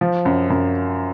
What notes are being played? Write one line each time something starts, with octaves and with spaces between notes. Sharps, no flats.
F3
F#2
F#2